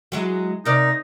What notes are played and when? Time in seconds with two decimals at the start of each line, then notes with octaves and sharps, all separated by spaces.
0.12 F#3 G#3 E4
0.65 C3 D#4 A#4 D5